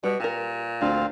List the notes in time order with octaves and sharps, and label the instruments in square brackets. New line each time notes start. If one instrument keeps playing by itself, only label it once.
[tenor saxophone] B2 [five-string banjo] G3
[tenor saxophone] A#2 [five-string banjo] G4 A#4
[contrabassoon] D2 [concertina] C4 F5 [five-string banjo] D4 F4